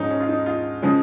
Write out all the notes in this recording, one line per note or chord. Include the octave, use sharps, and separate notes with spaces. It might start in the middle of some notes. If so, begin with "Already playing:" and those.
Already playing: G#2 F3 G#3 C#4 D#4
C#4
F4
D#4
F4
C#3 F3 G#3